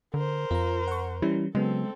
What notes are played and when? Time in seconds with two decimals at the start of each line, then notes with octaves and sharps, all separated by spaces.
0.14 D3 A#4 C5
0.51 F2 F4 A#5
0.88 F#5 C#6
1.22 E3 G3 C#4 E4
1.55 C#3 F#3 G#3 B3 C4 A4